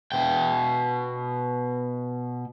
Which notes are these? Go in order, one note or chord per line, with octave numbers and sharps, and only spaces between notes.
B2 G5